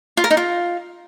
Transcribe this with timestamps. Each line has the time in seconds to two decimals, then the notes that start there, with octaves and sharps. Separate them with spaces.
0.17 F4
0.24 A#4
0.30 D#4
0.37 F4